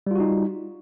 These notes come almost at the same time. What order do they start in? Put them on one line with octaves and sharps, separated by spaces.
G3 F4 F#4 D#4